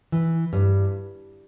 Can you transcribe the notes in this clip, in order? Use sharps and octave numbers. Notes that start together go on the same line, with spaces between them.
E3
G2